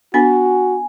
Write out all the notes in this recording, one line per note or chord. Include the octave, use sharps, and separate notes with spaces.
B3 D4 F#4 G#5